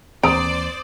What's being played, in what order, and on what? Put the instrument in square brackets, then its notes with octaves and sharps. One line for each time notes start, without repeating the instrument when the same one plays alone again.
[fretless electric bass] D#2 E3 C4 [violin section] C5 D5 [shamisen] A#5 [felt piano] D#6 D7